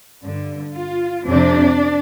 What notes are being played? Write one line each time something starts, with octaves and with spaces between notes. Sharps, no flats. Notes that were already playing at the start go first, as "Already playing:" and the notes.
G2 D3
F4
F2 C3 D4